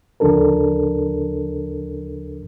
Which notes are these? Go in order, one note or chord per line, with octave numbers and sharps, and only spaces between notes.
D2 C#3 F3 D4 A4 A#4